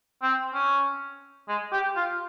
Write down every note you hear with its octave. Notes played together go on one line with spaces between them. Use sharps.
C4
C#4
G#3
G4
F4